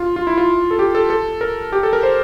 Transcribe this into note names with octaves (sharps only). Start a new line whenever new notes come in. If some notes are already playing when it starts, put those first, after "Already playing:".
Already playing: F4
F4
E4
F4
A4
G4
A4
A4
A#4
G4
A4
A#4
C5